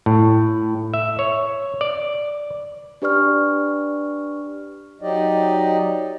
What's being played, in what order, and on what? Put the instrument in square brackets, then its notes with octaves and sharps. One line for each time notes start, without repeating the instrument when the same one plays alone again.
[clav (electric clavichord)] A2
E5
C#5
D5
[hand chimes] D4 G4 B4 D5 C#6 F6
[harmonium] F#3 D#4 G4 D5 D#5